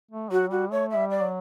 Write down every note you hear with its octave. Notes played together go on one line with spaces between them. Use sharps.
A3
F#3 F#4
G3 F#4
A3 C#5
E5
G3
D5
F#3